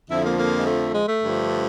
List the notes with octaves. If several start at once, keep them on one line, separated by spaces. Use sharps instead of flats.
F2 D3 F3 E4
A#3
A#3
G#3
A3
G#3
A3
G2 D3 F3